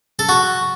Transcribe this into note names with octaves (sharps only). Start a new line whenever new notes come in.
A4
F#4